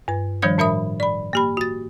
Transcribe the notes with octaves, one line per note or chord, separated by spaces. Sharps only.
G2 B4
D#3 F3 G3 D4 C#5 G#6
A2 D4 A#4 E5 B5 D#6
D5 B5
A#3 G4 B5
F#4 A6